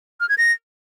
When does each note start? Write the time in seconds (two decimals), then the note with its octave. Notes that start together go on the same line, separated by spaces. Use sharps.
0.20 F6
0.29 G#6
0.38 A#6